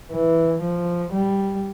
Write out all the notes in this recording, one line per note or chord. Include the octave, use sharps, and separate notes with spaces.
E3
F3
G3